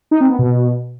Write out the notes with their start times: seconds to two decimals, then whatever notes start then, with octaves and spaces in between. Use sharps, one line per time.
0.11 D#4
0.21 C4
0.30 B3
0.39 B2